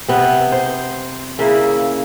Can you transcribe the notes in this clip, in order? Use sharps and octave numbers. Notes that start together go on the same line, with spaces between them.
C3 B3
C5
C#3 A#3 E4